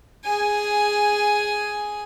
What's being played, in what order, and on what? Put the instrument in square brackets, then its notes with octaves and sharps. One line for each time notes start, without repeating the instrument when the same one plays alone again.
[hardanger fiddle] G#4 G#5